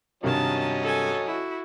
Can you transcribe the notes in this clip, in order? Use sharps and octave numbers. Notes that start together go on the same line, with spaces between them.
G2 C3 D#3 F#3 C#4 A#4 D#5 A5
A4 G#5
E4 F#4